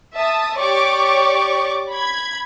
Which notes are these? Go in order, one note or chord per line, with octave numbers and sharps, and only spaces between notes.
E5 A5 D#6
G4 C#5 D5 C#6 D6
B5 G#6